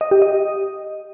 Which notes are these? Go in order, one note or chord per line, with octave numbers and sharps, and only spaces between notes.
D#5
G4
D#5